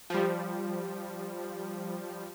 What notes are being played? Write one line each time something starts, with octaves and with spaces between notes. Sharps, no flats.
F3 G3